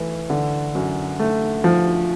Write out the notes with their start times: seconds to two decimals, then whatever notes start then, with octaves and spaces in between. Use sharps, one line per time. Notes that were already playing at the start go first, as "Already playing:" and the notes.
Already playing: E3 A3
0.30 D3
0.75 F#2
1.19 A3
1.64 F3